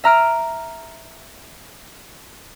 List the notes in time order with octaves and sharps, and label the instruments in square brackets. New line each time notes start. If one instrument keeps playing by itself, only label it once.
[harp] E5 A#5 F6 D7